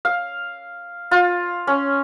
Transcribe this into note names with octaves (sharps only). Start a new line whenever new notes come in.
F5
F4
C#4